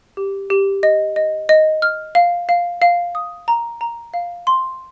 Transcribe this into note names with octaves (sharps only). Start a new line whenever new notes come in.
G4
G4
D#5
D#5
D#5
F6
F5
F5
F5
D#6
A#5
A#5
F5
C6